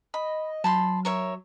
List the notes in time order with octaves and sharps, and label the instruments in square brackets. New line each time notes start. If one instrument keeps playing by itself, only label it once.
[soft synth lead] D#5 [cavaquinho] B5
[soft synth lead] F#3 [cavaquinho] A5 B5 C6
[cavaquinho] A#4 C#5 E5